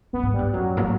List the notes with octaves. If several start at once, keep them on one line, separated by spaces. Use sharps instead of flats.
G2 B3
G#2
G3
G2
F#2 F#3
A#2
A2